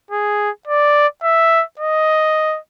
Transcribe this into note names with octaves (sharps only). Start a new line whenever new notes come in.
G#4
D5
E5
D#5